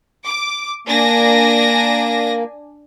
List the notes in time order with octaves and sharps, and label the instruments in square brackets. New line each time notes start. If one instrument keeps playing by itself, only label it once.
[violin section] D6
[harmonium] A#3 [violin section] D4 G#5 A#6